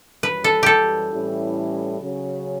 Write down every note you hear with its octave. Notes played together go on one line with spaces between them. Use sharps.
F#2 E3 G3 B4
A4
G4 A4
A2 E3 G3 C#4 E4
C#3 F#3 C#4